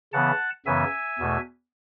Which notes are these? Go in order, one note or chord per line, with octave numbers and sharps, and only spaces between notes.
C#3 E3 B3 F#5 A5
F#2 C#3 E3 B3 E5 G#5
E2 B2 A3